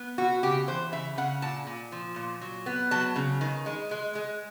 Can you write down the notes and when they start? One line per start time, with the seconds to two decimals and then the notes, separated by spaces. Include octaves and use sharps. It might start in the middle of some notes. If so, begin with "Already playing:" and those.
Already playing: B3
0.18 B2 F#4
0.43 C#3 G4
0.68 E3 C5
0.92 C#3 E5
1.18 C#3 F#5
1.42 A#2 A5
1.67 A#2
1.92 F3
2.16 A#2
2.41 F#3
2.66 B3
2.91 F#3 A5
3.16 C#3
3.41 D#3
3.66 G#3
3.91 G#3
4.15 G#3